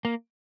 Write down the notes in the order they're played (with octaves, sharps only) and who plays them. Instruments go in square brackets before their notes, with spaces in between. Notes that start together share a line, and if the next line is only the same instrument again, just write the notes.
[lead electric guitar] A#3